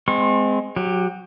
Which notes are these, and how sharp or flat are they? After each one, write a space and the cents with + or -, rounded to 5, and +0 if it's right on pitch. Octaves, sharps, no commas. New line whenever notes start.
G#3 +0 C4 -25 C#6 -40
F#3 -15 G4 +15